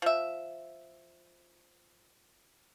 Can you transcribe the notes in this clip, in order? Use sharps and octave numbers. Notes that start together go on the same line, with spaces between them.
F3 E5